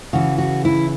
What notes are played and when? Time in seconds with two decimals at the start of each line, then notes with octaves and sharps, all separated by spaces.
0.13 C#3 E3 F#4
0.38 F#4
0.65 E4